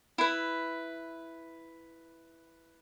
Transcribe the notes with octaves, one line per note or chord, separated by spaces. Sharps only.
E4 B4